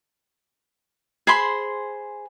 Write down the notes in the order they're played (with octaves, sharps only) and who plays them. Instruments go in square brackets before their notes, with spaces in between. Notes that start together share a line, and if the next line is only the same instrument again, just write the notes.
[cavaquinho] G#4 C5 B5 C6